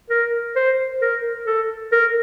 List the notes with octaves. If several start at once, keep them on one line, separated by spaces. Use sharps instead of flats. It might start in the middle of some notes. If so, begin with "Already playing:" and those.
A#4
C5
A#4
A4
A#4